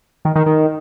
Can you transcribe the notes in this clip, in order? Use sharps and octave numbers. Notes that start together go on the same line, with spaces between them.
D#3
D#3
D#3